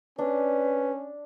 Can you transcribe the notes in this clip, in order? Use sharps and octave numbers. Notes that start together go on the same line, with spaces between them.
C#4 D4 B4